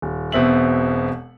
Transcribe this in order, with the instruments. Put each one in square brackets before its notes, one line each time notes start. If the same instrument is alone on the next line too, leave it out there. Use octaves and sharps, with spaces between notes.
[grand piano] D#1
E1 B2 C4 E5 F#7